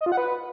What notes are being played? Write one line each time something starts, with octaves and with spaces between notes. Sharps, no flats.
D#5
F4
F#5
B4